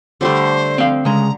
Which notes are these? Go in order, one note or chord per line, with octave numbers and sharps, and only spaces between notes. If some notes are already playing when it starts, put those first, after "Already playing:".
D3 G3 A3 C5
C4 F5
C#3 G#3 A#5